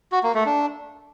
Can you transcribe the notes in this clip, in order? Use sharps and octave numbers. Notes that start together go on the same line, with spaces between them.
F#4
A#3
A3
D4